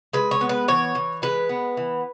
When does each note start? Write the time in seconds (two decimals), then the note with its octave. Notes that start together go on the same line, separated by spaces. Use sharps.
0.13 G#3 B4
0.31 C#5
0.41 B3
0.49 B4
0.68 E3 C#5
0.95 E3
1.22 G#3 B4
1.49 B3
1.77 E3